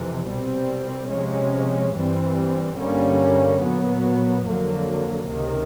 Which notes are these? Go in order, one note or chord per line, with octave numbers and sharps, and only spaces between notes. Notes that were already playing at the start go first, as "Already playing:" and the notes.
Already playing: F2 C3 E3
C2 B2 G3 C4
C3 F3 G#3 C#4
G2 E3 G3 C4
G2 D3 G3 A#3 C#4
A#2 F#3 B3
F2 D3 F#3 A#3
C#2 C3 D#3